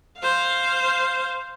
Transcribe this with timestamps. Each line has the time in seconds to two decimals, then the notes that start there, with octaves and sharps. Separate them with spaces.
0.20 C5 F5